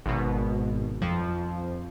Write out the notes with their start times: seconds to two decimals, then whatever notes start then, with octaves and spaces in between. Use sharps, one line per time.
0.06 G#1 B2
1.02 F2 F3